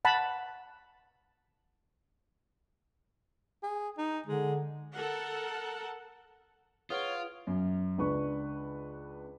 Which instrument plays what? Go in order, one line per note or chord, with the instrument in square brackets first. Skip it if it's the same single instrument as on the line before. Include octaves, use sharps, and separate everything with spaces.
[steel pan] F#5 A5 B5
[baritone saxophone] G#4
D#4
[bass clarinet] D3 [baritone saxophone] G#3
[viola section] A4 A#4 F#5
[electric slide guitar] F4 [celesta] G#4 B4 F#5 [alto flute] C#5 [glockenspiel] D#6 F6 D7
[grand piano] F#2
C#2 D4 B4 C#6